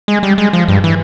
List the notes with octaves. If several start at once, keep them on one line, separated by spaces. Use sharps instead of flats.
G#3
G3
G#3
F3
G2
E3